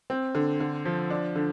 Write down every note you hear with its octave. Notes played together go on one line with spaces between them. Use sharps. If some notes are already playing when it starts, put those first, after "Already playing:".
C4
D3
D3
F3
D4
D3